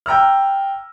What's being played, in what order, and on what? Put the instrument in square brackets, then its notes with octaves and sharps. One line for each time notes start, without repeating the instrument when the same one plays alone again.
[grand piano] G5 A#5 E6 F6